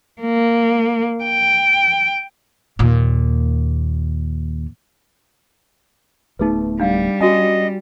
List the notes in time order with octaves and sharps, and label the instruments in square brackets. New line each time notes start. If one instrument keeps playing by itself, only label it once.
[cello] A#3
G5
[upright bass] D#2 A#2
[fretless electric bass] D1 A3 B3 [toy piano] D#4 G#4 B4
[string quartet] G3 [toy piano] D4 F5 F#5
[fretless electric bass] C#4 [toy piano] F#4 G#5 [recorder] D#5